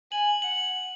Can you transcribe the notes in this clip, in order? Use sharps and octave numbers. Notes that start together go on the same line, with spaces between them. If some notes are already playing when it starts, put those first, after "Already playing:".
G#5 F#7
F#5 F#7